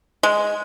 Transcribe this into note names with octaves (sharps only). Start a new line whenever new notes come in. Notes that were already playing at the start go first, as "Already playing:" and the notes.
G#3